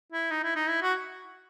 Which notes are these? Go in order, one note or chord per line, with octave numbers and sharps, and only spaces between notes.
E4
D#4
E4
D#4
E4
F#4